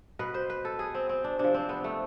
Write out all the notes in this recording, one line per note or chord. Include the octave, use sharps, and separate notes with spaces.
B2 B4
C5
B4
A4
G#4
C4
C4
D4
C3 F3 D4
C4
B3
A3